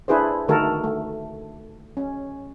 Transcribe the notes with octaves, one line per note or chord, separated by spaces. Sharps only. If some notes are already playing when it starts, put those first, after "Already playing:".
D4 E4 G#4 B4 C5
D3 D#3 A3 F#4 A4 A#4
A3
C#4